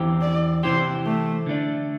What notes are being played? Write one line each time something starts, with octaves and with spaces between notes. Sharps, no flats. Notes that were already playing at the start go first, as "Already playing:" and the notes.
Already playing: E2 E3 C4 G4
D5
C3 E3 C4 G4 C5
A3
D3 A3 D4